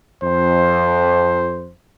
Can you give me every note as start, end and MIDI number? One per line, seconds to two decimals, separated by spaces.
0.22 1.69 41
0.22 1.72 72